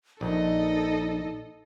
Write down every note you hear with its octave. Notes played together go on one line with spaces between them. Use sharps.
A#1 D#4 A4 D#5